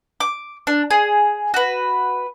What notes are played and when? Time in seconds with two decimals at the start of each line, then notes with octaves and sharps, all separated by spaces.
0.20 D6
0.67 D4
0.90 G#4
1.54 F#4 B4